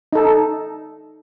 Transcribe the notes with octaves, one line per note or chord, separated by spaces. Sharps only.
D#4 A4